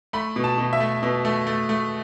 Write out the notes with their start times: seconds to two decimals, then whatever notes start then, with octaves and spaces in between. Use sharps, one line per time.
0.13 A3 B5
0.36 B2
0.44 A5
0.58 B2
0.73 E5
0.80 A3
1.03 B2
1.25 A3
1.47 A3
1.69 A3